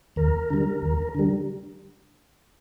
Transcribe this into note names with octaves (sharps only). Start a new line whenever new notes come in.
D#2 A#4
D3 G3
D#2
D3 G3